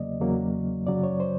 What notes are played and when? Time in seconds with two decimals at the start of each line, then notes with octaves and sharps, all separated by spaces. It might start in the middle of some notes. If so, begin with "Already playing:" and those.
Already playing: E2 C#3 F#3 A#3 D5 D#5
0.21 E2 C#3 F#3 A#3
0.87 F#2 C#3 F#3 D5
1.03 C#5
1.20 C5